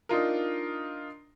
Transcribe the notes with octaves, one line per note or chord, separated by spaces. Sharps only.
D4 D#4 F4 A#4